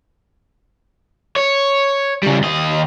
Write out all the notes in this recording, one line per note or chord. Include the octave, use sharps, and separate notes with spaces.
C#5
C#3 G3
D#2 D#5